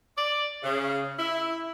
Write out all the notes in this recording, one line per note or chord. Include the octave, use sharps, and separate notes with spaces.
D5
C#3
E4